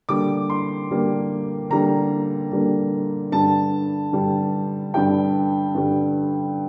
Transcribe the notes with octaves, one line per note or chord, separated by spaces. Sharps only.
D3 G3 A#3 D6
C6
D3 G3 A#3
D3 G3 A#3 A#5
D3 G3 A#3
G2 D3 G3 A5
G2 D3 G3
G2 D3 G3 G5
G2 D3 G3